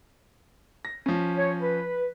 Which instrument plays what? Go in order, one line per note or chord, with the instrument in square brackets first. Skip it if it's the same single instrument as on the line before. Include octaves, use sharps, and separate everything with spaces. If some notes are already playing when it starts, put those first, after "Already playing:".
[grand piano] A#6
F3 C#4
[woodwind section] C#5
B4